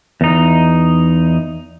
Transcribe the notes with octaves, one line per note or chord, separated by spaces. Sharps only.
E2 D#4